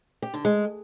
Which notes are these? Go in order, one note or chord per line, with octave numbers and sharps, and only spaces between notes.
G4
D3
G#3